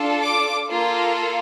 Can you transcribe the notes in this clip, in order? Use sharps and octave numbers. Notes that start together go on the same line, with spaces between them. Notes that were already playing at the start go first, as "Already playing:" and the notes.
Already playing: D4 F4 A4
D6
A#3 F4 A4